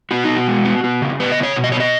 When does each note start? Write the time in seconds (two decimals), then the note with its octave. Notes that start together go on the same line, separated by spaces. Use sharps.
0.11 B3 F#4
0.24 B2 D#4
0.36 F#4
0.47 G#3
0.65 B3
0.84 B3
1.02 C#3
1.20 B3 B4
1.32 D#5
1.38 C#3
1.43 C#5
1.56 B2
1.64 D#5
1.72 B3 C#5
1.80 D#5